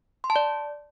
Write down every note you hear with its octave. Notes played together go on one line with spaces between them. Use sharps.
C6
A5
D5